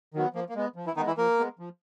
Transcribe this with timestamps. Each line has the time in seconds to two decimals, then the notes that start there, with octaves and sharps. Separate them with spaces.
0.14 D#3 F#3 B3
0.34 F3 A#3
0.49 A#3
0.56 G#3 B3
0.76 F3
0.86 E3 E4
0.96 D#3 G#3 B3 D#4
1.07 E3 E4
1.17 F3 A#3 A#4
1.38 G#3 B3
1.59 F3